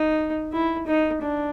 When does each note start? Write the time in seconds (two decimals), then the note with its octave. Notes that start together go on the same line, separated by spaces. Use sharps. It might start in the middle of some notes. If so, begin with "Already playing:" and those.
Already playing: D#4
0.52 E4
0.87 D#4
1.21 D4